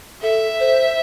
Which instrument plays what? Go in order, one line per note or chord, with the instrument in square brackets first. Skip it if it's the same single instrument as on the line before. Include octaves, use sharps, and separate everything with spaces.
[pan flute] A4 [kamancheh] E5
[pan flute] C5